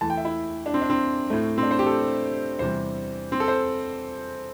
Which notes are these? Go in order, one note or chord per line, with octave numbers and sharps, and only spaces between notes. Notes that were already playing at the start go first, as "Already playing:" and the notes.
E2 E3 A3 A5
G5
E5
E4
D4
C4
D4
C4
A2 A3
C4
D4
C5
G4
A4
E2 C3 G3 C5
C4
A4
C5